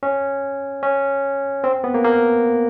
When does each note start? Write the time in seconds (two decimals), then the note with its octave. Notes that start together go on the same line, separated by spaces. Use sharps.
0.03 C#4
0.83 C#4
1.64 C4
1.84 B3
1.94 A#3
2.05 A#3